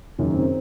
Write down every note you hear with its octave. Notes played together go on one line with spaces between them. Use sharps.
F#1 F#2 D#3 C#4
C4